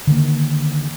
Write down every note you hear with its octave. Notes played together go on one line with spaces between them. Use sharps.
D3 D#3 G#3 A#3